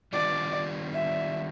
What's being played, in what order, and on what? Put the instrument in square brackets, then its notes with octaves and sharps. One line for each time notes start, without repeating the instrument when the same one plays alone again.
[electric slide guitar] D#3 G3 B3 D4 F4 [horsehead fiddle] D5
[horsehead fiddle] E5